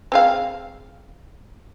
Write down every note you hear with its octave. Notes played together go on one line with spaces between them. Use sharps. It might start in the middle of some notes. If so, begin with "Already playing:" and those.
C4 G#4 F5